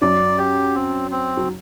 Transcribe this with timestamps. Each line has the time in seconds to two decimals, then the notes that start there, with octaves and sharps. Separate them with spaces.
0.02 F#2 F#3 D5
0.38 G4
0.75 C4
1.11 C4
1.37 F#3